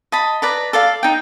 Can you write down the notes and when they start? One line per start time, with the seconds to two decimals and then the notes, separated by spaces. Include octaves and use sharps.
0.12 D#5 A5 B5
0.42 B4 D5 A#5
0.73 A4 D5 F5
1.03 D#4 G5